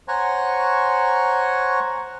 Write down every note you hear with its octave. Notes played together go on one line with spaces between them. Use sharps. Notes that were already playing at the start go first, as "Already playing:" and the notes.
C5 C#5 F#5 G#5 A#5 C#6